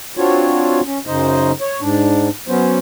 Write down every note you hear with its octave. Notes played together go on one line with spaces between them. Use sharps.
C4 D4 F4 F#4 C#5
C#4
F#2 C#3 D#4 C5 D#5
C#5
G#2 D4
F#3 B3 C#4 C5